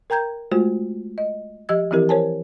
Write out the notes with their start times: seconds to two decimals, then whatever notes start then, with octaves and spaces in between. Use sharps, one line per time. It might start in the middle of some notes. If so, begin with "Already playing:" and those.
0.10 A#4 G5 A#5 G6 G#6
0.52 G#3 A3 F4 F#4 C5
1.18 D#5
1.69 F3 G4 D#5 E6 G#6
1.91 E3 F3 C4 E4 G4 A#4
2.09 A#4 C5 C#5 G#5 A5